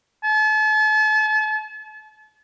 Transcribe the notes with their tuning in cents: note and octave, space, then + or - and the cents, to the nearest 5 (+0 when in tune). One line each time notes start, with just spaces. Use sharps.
A5 -40